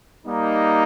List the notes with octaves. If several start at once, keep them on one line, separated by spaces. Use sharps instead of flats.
G3 A#3 D#4